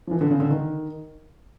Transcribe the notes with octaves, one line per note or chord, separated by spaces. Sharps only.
F3
E3
D3
C#3
D3
D#3